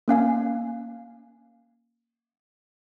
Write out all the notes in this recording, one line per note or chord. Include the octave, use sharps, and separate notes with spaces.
A#3 C#4 F5 G#5